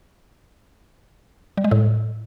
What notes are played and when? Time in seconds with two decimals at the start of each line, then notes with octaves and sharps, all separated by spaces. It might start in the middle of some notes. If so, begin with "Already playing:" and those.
1.57 G3
1.64 G#3
1.71 A2